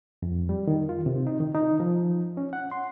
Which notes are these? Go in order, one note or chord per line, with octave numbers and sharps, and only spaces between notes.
F2
G3
D#3
F4
C3
D#4
D#3
D#4
F3
C#4
F#5
C6